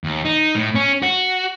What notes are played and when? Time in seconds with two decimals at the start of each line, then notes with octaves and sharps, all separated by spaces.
0.04 D#2
0.25 D#4
0.56 A2
0.75 C#4
1.02 F#4